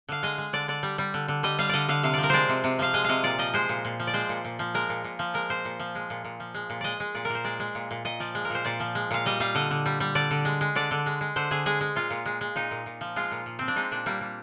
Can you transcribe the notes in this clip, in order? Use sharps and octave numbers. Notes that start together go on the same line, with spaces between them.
D3 F5
G#3 D#5
G#3
D3 D5
D3 D5
G3
G3
D3
D3
G3 D#5
G3 F5
D3 D5 D#5
D3 F5
C3 F5
F3 D5
A#4
G#3 C5 D5
C3
C3
F3 F5
G#3 D#5
C3 D#5 F5
A#2 D5
F3 D#5
G#3 C5
A#2
A#2
F3
D5
G#3 C5
A#2
A#2
F3
G#3 A#4
A#2
A#2
F3
G#3 A#4
A#2 C5
A#2
F3
G#3
A#2
A#2
F3
G#3
A#2
G#3 D5 D#5
G#3
A#2 D5
A#2 A#4
C5
G#3 D5
G#3
A#2
A#2
A#2 D#5
F3 D5
G#3
A#4
A#2 C5
A#2 D5
F3
G#3
A#2 F5
G3 D#5
G3 F5
D3 D#5
D3
G3
G3
D3 D5
D3
G#3
G#3
D3 D5
D3
G#3
G#3
D3 C5
D3 G#4
G#3 G#4
G#3
A#2 F4
A#2
G#3
G#3
A#2 D#4
A#2
A#2
F3
G#3 F4
A#2
A#2
F3 C4
D4
G#3 D#4
A#2 D4
G3 A#3
G3